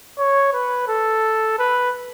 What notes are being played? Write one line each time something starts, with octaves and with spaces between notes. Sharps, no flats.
C#5
B4
A4
B4